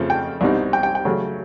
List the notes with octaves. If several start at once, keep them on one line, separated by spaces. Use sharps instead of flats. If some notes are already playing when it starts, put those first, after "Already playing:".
Already playing: F2 C#3 F3 A3 C4
G5
C2 B2 G3 C4 D#4
G5
G5
G5
C#3 F#3 A3 C#4